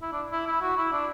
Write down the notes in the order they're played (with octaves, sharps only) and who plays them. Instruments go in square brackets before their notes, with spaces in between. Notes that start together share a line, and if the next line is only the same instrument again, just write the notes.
[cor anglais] E4
D4
E4
E4
F#4
E4
D4